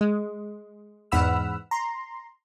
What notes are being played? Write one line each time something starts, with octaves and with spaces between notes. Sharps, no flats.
G#3
E2 G#2 F#5 B5 E6 F6
A#5 C6